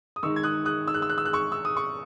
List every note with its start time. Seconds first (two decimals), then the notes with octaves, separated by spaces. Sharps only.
0.16 D#6
0.23 D#3 G#3 D#4 C#6 E6
0.36 G#6
0.43 D#6 F#6
0.65 D#6 F#6
0.88 E6
0.94 F#6
1.02 E6
1.10 F#6
1.18 E6
1.25 F#6
1.33 C#6 E6
1.52 E6
1.65 D#6
1.77 C#6